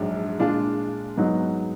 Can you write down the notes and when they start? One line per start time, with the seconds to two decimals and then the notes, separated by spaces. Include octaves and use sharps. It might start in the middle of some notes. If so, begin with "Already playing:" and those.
Already playing: A#1 G#2 F#3 D4
0.39 A#2 G#3 D4 F4
1.17 G#2 F#3 B3 D#4